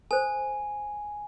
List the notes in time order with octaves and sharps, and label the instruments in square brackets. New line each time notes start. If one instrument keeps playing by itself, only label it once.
[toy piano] A4 C5 [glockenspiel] G#5